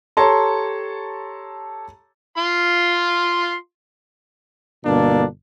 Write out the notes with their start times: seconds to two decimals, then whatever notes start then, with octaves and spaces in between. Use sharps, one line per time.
0.17 G4 A4 C#5 A5 A#5 C6
2.38 F4 C6
4.84 G1 B2 A#3 D4 A4